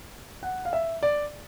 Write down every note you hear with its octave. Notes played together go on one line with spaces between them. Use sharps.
F#5
F5
E5
D5